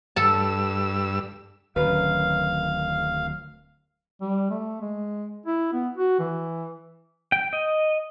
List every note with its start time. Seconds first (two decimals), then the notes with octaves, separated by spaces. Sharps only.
0.16 G2 A4 A5 E6
1.76 D1 F#2 D#3 B4 F5
4.21 G3
4.50 A3
4.81 G#3
5.46 E4
5.73 B3
5.97 F#4
6.19 E3
7.32 G5
7.53 D#5